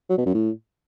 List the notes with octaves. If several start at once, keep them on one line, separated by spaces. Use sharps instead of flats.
F#3
B2
F#2
A2